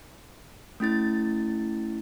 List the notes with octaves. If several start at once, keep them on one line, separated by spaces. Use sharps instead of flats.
A3 C#4 E4 A6